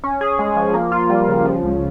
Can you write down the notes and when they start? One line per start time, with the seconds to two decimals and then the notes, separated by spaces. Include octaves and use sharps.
0.04 C#4
0.21 G#4
0.39 G#3
0.56 F3
0.74 A#3
0.92 F4
1.10 G3
1.28 C#3
1.45 F3
1.63 C#2